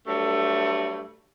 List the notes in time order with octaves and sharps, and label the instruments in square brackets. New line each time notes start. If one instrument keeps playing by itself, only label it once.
[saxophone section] G2 F#3 A3